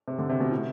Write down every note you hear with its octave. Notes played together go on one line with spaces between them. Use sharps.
C3
D3
C3
B2
A2